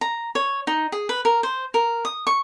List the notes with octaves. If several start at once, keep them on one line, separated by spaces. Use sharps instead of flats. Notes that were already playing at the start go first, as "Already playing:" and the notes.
A#5
C#5
D#4
G#4
B4
A#4
C5
A#4
D#6
C#6